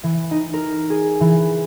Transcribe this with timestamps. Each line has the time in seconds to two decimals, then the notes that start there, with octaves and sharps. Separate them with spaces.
0.03 E3
0.31 D#4
0.54 A#4
0.90 G#4
1.20 E3